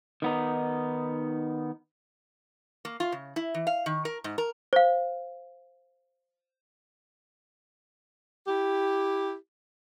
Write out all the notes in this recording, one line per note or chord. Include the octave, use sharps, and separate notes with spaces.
D#3 B3 D#4
A#3
F4
C#3
E4
E3
F5
D#3
A#4
G#2
A#4
C5 F5
E4 G4